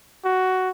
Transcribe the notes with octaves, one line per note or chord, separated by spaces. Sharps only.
F#4